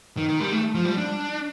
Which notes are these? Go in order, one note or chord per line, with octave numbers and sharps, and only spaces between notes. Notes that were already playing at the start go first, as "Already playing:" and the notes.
D#3
D#3
G3
A3
F3
G3
D4